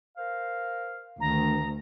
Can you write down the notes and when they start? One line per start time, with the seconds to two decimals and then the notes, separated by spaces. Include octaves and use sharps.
0.17 A#4 C5 F5
1.20 D2 D#3 A#5